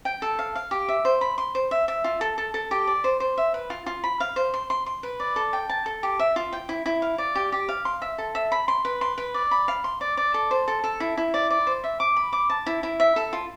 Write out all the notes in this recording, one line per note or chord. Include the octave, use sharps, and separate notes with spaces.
G5
A4
F5
F5
G4
E5
C5
B5
C6
C5
E5
E5
F4
A4
A4
A4
G4
D5
C5
C5
E5
B4
F4
F4
B5
F5
C5
C6
C6
C6
B4
D5
A4
G5
A5
A4
G4
E5
F4
G5
E4
E4
F5
D5
G4
G4
F5
C6
E5
A4
E5
B5
C6
B4
C6
B4
D5
B5
F5
C6
D5
D5
A4
C5
A4
A4
E4
E4
D5
D5
C5
E5
D6
B5
D6
A5
E4
E4
E5
A4
F4